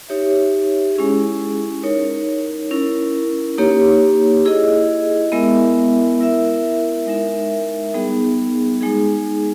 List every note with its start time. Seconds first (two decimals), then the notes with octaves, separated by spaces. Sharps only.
0.09 D#4 G4 C#5 E5
0.96 G#3 C#4 E4 G#4
1.83 D#4 A#4 C#5
2.71 C#4 E4 A#4
3.58 A#3 D#4 G4 C#5
4.45 E4 G#4 D#5
5.32 G#3 B3 E4 A#4 E5
6.20 E4 A#4 E5
7.07 G#3 D#4 A#4 E5
7.94 G3 B3 D#4 G#4
8.81 G#3 D#4 G#4